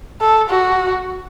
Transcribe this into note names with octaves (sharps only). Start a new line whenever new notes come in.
A4
F#4